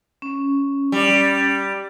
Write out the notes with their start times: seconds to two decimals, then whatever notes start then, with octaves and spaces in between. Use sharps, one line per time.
0.22 C#4
0.92 G3